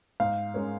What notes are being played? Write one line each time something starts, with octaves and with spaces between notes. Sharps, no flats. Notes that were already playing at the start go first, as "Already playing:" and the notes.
G#2 F5
G#3 C#4 A#4 C#5